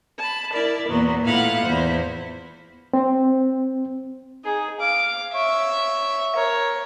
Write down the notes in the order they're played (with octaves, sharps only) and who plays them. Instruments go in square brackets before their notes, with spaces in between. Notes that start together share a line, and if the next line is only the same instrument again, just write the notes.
[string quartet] A5 B5
E4 A#4 D5
E2 A#2 F#3 B3
A2 B3 E4 F4 F5 F#5
E2 E4 C5
[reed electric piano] C4
[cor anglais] D#4 [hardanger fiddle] G#4
[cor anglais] F5 [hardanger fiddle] D6
[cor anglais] C#5 [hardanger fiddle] E5
[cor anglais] A#4 [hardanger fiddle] C#5